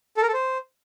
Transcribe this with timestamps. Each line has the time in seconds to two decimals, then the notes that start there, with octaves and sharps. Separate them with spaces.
0.17 A4
0.23 A#4
0.28 A4
0.34 C5